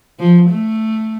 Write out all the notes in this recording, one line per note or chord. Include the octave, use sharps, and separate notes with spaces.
F3
A3